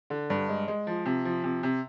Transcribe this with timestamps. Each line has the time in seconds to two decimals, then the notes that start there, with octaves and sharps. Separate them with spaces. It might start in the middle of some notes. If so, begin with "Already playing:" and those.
0.10 D3
0.30 G2
0.49 G#3
0.68 G#3
0.87 F3
1.06 C3
1.25 F3
1.44 C3
1.63 C3